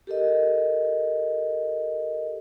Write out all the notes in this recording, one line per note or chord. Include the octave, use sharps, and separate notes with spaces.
G4 A4 A#4 D#5